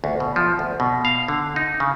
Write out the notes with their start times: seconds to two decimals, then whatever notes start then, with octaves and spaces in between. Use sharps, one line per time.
0.04 D2
0.20 B2
0.36 F3
0.59 D2
0.80 B2
1.05 F5
1.28 D3
1.56 D#4
1.80 C#3